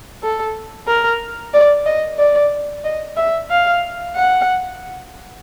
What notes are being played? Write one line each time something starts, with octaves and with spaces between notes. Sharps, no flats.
A4
A#4
D5
D#5
D5
D#5
E5
F5
F#5